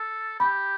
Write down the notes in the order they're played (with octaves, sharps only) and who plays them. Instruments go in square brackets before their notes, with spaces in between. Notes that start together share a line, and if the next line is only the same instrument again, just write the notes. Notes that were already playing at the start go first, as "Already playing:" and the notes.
Already playing: [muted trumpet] A4
[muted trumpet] G4 [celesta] B5